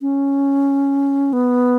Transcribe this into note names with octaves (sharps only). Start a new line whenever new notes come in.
C#4
B3